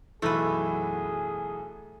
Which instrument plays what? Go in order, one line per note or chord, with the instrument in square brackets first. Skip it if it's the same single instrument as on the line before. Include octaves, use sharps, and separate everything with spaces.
[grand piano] B1 E3 [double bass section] F#2 F#3 [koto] A3 B4 [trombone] G#4